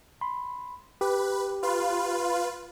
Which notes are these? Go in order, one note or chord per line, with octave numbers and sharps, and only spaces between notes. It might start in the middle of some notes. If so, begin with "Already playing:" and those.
B5 C6
G4 B4
F4 B4